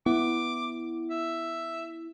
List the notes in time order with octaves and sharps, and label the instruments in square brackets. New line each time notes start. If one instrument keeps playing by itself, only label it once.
[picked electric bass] B3 [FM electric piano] E4 [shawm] D6
[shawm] E5